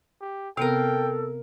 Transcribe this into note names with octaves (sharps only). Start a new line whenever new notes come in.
G4
C3 B3 C4 A4 A#4 F5 G5